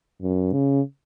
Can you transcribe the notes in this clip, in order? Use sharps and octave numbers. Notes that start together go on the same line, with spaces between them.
F#2
C#3